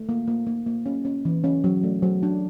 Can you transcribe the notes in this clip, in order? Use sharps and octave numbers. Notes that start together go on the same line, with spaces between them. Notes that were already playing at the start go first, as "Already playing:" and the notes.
Already playing: A3
A#3
A#3
A#3
A#3
C#4
C#4
E3
C#4
F#3
A3
F#3
D4